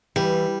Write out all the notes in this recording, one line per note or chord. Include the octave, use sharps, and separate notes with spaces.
E3 G3